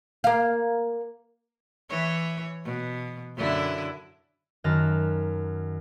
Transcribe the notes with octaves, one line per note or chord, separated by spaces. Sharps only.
A#3 F5
E3 C#5
B2
F#2 D3 E4
F#2 D#3 A5 F6 F#6 A#6